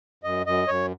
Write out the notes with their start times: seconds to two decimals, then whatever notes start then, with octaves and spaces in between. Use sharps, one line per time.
0.24 F#2 D#5
0.46 F#2 D#5
0.68 F#2 C#5